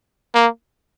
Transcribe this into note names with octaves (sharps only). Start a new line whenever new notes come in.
A#3